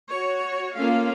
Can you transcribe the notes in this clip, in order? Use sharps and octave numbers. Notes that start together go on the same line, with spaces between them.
F#4 C#5
A3 A#3 C#4 F4 F5